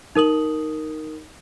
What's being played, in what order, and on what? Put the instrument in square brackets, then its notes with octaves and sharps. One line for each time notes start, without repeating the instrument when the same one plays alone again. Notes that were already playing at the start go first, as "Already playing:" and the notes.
[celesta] D#4 A#4 D#6 F#7